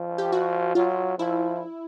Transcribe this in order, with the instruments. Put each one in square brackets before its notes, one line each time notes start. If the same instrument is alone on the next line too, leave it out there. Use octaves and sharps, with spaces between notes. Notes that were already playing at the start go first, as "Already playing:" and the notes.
Already playing: [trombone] F3
[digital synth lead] G4
F#4
[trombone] F#3 [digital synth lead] F4
[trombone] F3 [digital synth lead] E4